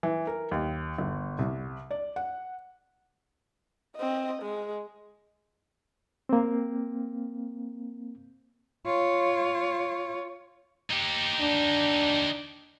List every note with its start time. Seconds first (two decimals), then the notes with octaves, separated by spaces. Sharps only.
0.03 E3
0.27 A#4
0.51 D#2
0.98 G1
1.39 C2
1.91 D5
2.16 F#5
3.96 C4 D#5
4.42 G#3
6.29 A#3 C4
8.85 F4 C#5
10.90 D#4 G4
11.41 D4